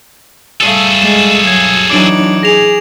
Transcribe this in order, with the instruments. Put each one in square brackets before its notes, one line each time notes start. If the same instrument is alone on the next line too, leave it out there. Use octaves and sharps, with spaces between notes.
[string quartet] G3 A3 F5 [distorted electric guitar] G#4 A4
[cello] G#3 [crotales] E7
[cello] F#3 [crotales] G#6
[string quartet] E3 D#4 [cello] F#3 D4 [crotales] D6 D7 F#7
[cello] G#4 [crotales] A#6 F7